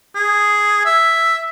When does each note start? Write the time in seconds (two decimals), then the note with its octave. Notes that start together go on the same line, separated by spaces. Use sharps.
0.16 G#4
0.86 E5